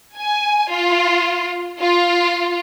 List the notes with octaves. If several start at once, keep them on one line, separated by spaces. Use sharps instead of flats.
G#5
F4
F4